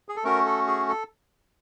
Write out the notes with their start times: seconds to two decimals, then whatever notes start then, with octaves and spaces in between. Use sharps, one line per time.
0.09 G#4
0.16 A4
0.24 A3 C#4 F#4 A#4
0.45 A4
0.67 G#4
0.89 A4